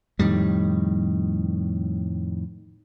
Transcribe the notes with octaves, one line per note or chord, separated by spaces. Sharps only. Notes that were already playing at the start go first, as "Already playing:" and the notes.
F2 A2 D#3 G3